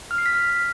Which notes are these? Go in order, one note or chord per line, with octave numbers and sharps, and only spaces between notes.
F6
C7
B6
F6